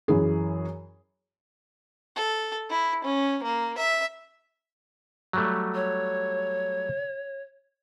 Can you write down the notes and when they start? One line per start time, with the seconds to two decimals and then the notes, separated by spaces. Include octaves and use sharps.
0.08 F#2 E3 G#4
2.16 A4
2.70 E4
3.04 C#4
3.43 A#3
3.78 E5
5.33 F#3 G3 A3
5.75 C#5